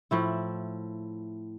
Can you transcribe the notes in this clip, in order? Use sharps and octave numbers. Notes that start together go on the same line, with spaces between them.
A2 F3 E4